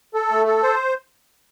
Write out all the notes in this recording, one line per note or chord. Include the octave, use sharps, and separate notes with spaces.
A4
A3
A4
C5